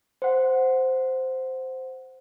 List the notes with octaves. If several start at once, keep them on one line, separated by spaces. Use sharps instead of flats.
C5 F#5